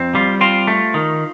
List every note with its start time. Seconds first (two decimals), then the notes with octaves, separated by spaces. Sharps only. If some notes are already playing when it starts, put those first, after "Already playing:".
Already playing: F2 C4
0.15 G3 F4
0.41 C4 F4
0.67 A3
0.94 D#3